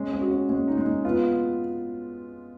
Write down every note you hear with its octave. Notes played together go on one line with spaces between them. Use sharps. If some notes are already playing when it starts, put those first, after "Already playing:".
Already playing: G#3 C#4
C#4
F#4
C#4
G#3 C#4
D#4
G#3
D#4
B3 F4